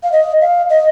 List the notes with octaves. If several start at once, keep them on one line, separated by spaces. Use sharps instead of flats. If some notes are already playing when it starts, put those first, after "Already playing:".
F5
D#5
F5
D#5